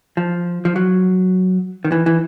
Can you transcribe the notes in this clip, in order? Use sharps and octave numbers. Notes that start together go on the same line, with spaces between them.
F3
F3
F#3
D#3
E3
E3